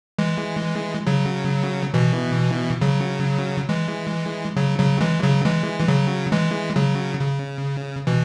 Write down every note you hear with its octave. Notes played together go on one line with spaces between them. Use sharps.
E3 G#3
C#3 F#3
B2 E3
C#3 F#3
E3 G#3
C#3 F#3
C#3 F#3
E3 G#3
C#3 F#3
E3 G#3
E3
C#3 F#3
E3 G#3
C#3 F#3
C#3
B2 E3